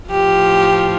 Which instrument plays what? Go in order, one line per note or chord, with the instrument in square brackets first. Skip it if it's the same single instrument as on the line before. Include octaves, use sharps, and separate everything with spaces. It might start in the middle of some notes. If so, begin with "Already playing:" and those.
[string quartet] A2 F3 G4